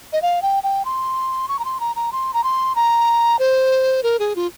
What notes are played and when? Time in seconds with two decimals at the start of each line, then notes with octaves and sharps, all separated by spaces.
0.13 D#5
0.22 F5
0.42 G5
0.63 G5
0.85 C6
1.48 C#6
1.59 A#5
1.65 C6
1.80 A#5
1.96 A#5
2.12 C6
2.34 A#5
2.44 C6
2.76 A#5
3.39 C5
4.03 A#4
4.19 G#4
4.36 F4